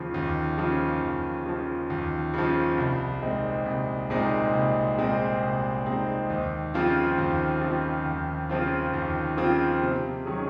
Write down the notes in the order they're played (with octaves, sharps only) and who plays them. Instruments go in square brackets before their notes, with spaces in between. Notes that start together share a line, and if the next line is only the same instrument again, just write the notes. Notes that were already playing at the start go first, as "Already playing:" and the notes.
Already playing: [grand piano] D#2 C#3 F3
D#2
C#3 F3
D#2
C#3 F3
D#2
C#3 F3
C2
A#2 G#3 C4 D#4
C2
A#2 G#3 C4 D#4
C2
A#2 G#3 C4 D#4
C2
A#2 G#3 C4 D#4
D#2
C#3 F3 C4 F4
D#2
C#3 F3 C4 F4
D#2
C#3 F3 C4 F4
D#2
C#3 F3 C4 F4
C3
D#3 F#3 C#4 G#4